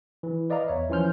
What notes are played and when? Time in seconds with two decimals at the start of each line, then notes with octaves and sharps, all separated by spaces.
0.23 E3
0.50 B4 D5 D#5 F5 A#5
0.68 E2 C#5 E5
0.90 E3 F3 C#4 C6 F6 G6